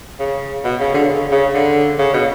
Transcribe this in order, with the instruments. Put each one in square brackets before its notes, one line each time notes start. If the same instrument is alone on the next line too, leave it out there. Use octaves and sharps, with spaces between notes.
[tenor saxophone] C#3
B2
C#3
D3
C#3
C#3
D3
C#3
B2